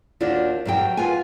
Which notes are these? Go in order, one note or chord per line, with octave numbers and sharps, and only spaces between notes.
D#2 D4 F4 F#4 D5
G2 F#3 G5
F4 B4 F#5 G#5